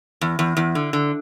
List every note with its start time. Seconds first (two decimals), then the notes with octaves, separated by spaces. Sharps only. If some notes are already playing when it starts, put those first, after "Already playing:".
0.21 E2
0.39 E2
0.57 E2
0.75 D3
0.93 D3